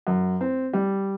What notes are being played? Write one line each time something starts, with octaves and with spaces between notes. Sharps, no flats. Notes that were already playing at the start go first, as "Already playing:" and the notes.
F#2
C4
G3